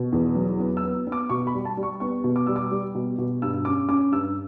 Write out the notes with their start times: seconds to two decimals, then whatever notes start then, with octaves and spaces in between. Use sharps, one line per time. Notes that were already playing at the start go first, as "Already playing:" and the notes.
Already playing: B2
0.12 E2
0.35 F#3
0.60 B3
0.77 E6
0.83 B3
1.07 B3
1.12 D6
1.29 B2 C#6
1.47 B5
1.54 G3
1.65 A5
1.77 G3
1.83 C#6
2.00 B3 C#6
2.24 B2
2.36 D6
2.47 G3 E6
2.56 D6
2.71 G3
2.95 B2
3.18 B2
3.42 G2 E6
3.65 C#4 D6
3.89 C#4 D6
4.12 G2 E6